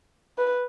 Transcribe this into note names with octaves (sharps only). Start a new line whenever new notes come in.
B4